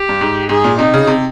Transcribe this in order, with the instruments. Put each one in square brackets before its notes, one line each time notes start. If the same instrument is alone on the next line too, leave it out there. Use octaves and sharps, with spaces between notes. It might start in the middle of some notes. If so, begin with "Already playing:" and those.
Already playing: [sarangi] G4
[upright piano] G2
G#2
[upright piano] G#2 [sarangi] G#4
[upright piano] A#2
[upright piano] C3 [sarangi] D#4
[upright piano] C#3
C3